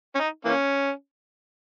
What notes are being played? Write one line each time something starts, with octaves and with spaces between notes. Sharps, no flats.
C#4
D#4
E3 A#3 C#4